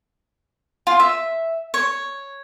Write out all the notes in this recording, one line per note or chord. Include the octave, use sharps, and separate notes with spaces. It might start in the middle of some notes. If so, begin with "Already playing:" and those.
F4
E5
C#5